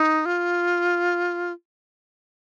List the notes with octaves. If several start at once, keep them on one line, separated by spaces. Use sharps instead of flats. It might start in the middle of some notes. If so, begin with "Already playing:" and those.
Already playing: D#4
F4